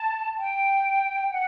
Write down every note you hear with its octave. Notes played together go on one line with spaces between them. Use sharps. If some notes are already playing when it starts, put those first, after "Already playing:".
Already playing: A5
G5
F#5